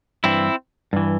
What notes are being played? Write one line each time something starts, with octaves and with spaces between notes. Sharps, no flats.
G2 E3 C4 E4
G2 E3